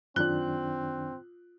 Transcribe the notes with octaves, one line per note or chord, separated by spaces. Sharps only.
F#2 D#3 C4 D4 F4 F#6